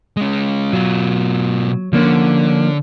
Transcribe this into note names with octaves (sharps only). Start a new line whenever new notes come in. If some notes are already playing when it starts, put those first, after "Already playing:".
G#3 C#4
B2 F#3 F4
D3 F3 A#3 C#4